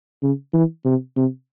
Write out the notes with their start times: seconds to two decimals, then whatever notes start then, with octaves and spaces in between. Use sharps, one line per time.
0.23 C#3
0.54 E3
0.85 C3
1.17 C3